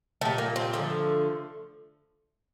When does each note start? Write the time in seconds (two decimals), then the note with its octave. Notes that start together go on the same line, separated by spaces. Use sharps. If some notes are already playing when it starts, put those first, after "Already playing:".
0.21 A#2 G3 A3
0.38 A#3
0.56 C4
0.73 D3 F3 A3 A#3